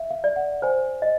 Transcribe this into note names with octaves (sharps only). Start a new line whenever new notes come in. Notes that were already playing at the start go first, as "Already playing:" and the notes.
Already playing: E5 F5
F5
D5
F#5
C5 G#5
D#5